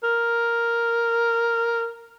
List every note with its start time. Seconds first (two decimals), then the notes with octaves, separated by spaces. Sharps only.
0.03 A#4